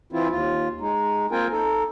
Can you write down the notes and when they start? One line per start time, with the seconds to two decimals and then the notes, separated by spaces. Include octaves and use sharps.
0.13 E3 C4 E4 F4
0.30 D#2 F4
0.80 G#3 D#4
1.31 A#3 C4 F4 A#4 G5 G#5
1.52 D#4 A4